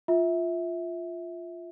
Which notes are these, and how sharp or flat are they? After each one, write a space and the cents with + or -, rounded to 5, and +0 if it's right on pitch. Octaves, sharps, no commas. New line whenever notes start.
F4 +0 E5 -15